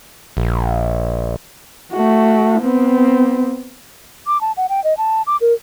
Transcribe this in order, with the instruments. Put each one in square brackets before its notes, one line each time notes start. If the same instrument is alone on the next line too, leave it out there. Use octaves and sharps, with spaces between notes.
[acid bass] A#1
[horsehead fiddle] A3 F#4
B3 C4
[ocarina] D6
A5
F#5
G5
D#5
A5
D6
A#4